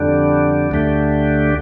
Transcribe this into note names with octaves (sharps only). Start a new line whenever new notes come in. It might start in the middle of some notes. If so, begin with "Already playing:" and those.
Already playing: F2 D3 G3 D4
D2 D3 A3 D4 G4